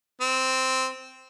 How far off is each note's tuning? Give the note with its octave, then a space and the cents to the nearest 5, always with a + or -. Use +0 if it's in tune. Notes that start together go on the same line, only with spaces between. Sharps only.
C4 -5